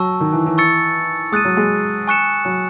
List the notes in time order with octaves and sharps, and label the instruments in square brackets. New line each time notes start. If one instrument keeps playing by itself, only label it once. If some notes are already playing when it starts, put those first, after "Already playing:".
Already playing: [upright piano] F#3 [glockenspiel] A5 C#6 E6
[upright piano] D#3
E3
E3
[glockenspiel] C#6 E6 A6 C#7
[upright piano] G#3 [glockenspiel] D#6 F#6 A6 D#7
[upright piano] F#3
G#3
[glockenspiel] G#5 C#6 F#6 C#7 E7
[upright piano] F#3